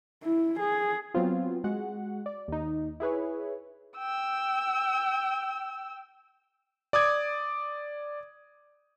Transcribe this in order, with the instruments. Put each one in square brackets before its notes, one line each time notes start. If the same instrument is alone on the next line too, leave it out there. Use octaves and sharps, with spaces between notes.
[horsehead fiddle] E4
G#4
[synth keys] F#3 B3 C4 F4
G#3 F#4 F#5
D5
D#2 D#4
E4 G#4 B4 C#5
[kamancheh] G5 E6
[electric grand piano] D5 D6 D#6 G#6